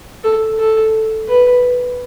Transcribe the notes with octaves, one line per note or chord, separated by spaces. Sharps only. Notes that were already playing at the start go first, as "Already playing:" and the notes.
A4
A4
B4